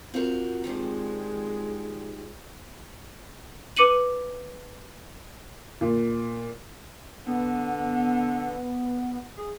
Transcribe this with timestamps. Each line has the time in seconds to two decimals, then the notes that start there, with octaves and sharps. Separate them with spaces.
0.14 C4 F4 F#4 A#4
0.64 D#3 F3 G3 G#3
3.77 B4 D6 C#7 D#7 F#7
5.81 A#2
7.26 D3 B3
9.37 G#4